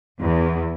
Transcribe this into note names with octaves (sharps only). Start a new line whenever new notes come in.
E2